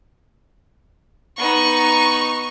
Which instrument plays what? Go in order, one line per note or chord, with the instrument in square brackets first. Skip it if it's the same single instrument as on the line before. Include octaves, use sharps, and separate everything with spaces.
[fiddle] B3 D#4 [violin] C#6